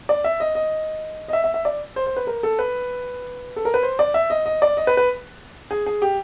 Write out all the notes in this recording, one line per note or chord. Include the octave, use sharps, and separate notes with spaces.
D5
E5
D#5
D#5
D#5
E5
E5
E5
D5
C5
C5
B4
A#4
A4
B4
A4
A#4
B4
C5
D5
E5
D#5
D#5
D5
D#5
B4
B4
G#4
G#4
G4